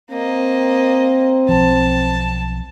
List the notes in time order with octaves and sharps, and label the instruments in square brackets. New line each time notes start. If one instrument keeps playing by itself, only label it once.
[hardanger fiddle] A#3 D#5 [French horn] C4
[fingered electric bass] B1 F3 [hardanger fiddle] A5